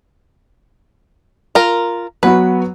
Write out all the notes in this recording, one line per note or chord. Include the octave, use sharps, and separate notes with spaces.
F4 A#4
F#3 B3 F#4 B4